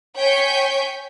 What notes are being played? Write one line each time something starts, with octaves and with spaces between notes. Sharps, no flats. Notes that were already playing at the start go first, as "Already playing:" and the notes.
C#5 G5 G#5 C#6 G6 B6